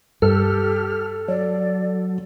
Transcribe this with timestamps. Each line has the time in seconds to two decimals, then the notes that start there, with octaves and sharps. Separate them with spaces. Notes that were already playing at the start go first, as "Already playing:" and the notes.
0.22 G2 G4 A4 F6
1.28 F#3 D5